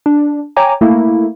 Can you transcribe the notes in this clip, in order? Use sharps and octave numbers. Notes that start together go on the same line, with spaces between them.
D4
C#5 G5 G#5 A#5 D6
A3 A#3 E4